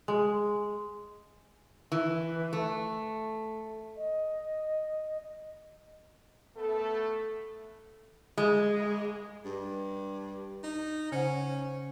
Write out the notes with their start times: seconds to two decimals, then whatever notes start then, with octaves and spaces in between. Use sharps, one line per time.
0.08 G#3
1.92 E3
2.53 A3
3.96 D#5
6.57 A3 B3 A4
8.38 G#3
9.45 G2
10.63 D#4
11.12 C#3 C#4 C5 F#5